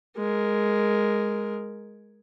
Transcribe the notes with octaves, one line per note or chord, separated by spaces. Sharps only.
G#3 A#4